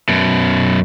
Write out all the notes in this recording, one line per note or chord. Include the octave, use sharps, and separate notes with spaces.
F#2 B2